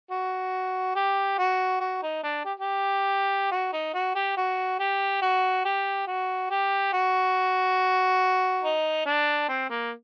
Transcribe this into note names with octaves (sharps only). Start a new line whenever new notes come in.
F#4
G4
F#4
F#4
D#4
D4
G4
G4
F#4
D#4
F#4
G4
F#4
G4
F#4
G4
F#4
G4
F#4
D#4
D4
C4
A#3